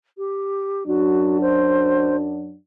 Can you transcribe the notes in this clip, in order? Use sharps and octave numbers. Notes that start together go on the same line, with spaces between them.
G4
F#2 F#3 D4 F#4
C5